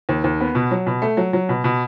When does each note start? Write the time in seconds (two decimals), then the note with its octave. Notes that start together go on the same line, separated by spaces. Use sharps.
0.09 D#2
0.24 D#2
0.41 B3
0.55 B2
0.71 F#3
0.86 B2
1.02 A3
1.17 F#3
1.33 F#3
1.49 B2
1.64 B2